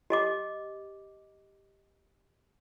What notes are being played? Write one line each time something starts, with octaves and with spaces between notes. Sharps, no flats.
G4 D#5 D6